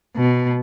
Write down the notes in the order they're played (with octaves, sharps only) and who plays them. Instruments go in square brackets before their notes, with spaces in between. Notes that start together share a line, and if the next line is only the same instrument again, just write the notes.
[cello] B2